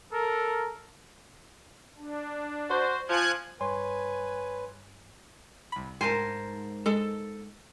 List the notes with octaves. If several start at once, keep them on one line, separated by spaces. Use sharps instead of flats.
A4 A#4
D4
F#4 C5
F3 G#5 F#6 G#6
G2 B4 C#5 G#5 C6
C2 B5
G#2 A#4 C5 G#5 A5
G#3 A4